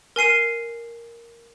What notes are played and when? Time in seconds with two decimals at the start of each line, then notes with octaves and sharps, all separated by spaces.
0.16 A#4 G#5 C7 D#7